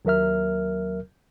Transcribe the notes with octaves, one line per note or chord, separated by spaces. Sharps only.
D#2 F#3 A#4 E5 F6